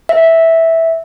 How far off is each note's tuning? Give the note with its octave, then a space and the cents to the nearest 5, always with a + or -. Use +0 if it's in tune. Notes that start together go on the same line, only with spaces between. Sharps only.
E5 -10